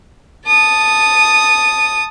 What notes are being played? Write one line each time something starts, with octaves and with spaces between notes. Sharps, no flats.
A5 D#6